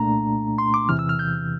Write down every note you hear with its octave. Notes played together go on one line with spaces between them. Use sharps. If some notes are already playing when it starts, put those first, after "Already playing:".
Already playing: C2 A#2 A3 D4 A#5
C6
D6
E2 C3 E3 F6
E6
F6
G6